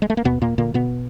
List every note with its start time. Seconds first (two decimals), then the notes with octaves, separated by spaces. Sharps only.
0.02 G#3
0.10 A3
0.17 A#3
0.24 D#2 B2 B3
0.42 A#2 A#3
0.58 A#2 D3 A#3
0.74 B2 B3